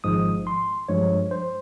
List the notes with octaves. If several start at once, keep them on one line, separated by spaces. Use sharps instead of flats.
G#1 G#2 F3 G#3 D#6
C6
G2 F3 G#3 C#5
C5